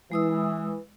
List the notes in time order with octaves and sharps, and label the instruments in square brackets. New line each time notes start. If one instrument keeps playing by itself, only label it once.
[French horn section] E3 [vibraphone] G#3 D#6 E6